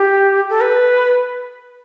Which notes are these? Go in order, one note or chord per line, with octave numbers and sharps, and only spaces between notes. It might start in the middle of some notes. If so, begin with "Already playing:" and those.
Already playing: G4
A4
B4